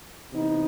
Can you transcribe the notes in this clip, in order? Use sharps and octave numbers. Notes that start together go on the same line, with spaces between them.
C3 E3 B3 D#4